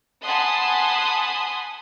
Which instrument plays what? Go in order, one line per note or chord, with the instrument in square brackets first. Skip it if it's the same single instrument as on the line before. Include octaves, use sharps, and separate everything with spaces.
[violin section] F#5 G#5 A5 B5 C6 D#6